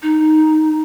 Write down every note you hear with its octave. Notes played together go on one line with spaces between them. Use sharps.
D#4